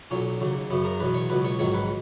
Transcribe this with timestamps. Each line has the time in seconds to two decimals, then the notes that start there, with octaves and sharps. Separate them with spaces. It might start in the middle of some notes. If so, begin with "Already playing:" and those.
0.11 B1 A#2 F#3 C#4
0.41 D#2 C#3 F#3
0.70 F#2 C#3 F#3 B3
0.85 A#4
1.00 E2 B2 F#3 B4
1.14 C#5
1.29 C#2 B2 F#3 B4
1.45 C#5
1.59 A#1 G#2 D#3 F#3 C#5
1.74 B4